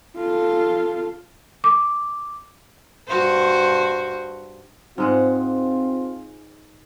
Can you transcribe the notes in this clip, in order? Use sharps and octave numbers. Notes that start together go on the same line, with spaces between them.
F4 A4
D6
G2 F#4 C5
G#2 G#3 C4 F4 F#5